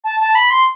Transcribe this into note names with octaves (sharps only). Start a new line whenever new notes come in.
A5
A5
B5
C6